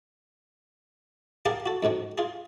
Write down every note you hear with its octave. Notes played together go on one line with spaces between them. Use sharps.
G4 G#4 A#4 F5 F#5 A5
F#4 A4
F2 G#2 B2 D#3
F4 G#4